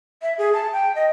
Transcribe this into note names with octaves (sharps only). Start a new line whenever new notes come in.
E5
G#4
A5
G5
D#5